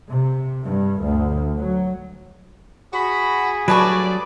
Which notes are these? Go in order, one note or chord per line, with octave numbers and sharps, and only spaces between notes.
C3
G2
D2
F#3
F#4 G#4 B5
G2 F#3 A3 B4 D5 A5 C#6